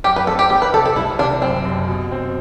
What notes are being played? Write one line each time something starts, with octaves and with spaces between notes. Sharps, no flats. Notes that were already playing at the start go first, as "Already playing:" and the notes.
F#2 G4
B4
C4 A4
G4
G3 G4
B4
C3 A4
A4
C2 E4
C3 D4
F#2 C4
F#1
B2
C4